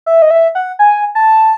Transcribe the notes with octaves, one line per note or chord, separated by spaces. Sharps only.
E5
D#5
E5
F#5
G#5
A5